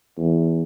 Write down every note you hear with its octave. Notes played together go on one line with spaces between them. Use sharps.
E2